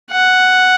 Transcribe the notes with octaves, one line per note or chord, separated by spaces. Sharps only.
F#5